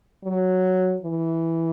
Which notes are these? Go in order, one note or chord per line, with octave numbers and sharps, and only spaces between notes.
F#3
E3